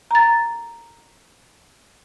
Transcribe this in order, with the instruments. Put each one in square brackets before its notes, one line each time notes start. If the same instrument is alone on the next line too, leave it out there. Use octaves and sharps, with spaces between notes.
[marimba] A#5 A6